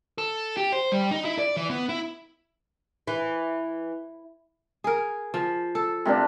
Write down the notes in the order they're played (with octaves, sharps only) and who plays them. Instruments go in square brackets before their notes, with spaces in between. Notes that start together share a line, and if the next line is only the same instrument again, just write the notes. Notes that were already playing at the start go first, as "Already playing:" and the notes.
[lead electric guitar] A4
G4
C5
G3
D#4
E4
D5
E3
B3
E4
[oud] E3
[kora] G#4 A#4
F3
A4
[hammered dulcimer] C3 A#3 D4